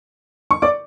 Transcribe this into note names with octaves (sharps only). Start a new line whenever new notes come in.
C#6
D5 D6